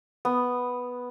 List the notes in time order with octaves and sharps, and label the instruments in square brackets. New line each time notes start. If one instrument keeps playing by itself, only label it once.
[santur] B3